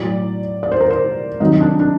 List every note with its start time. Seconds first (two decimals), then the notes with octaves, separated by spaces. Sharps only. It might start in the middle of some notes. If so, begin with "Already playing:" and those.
Already playing: A2 F#3 D5
0.63 D5
0.72 C5
0.81 A#4
0.90 C5
1.40 C3 D#3 F#3 D#4
1.60 D4
1.80 D4